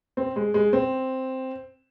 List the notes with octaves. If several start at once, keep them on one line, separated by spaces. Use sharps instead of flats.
C4
G#3
G#3
C4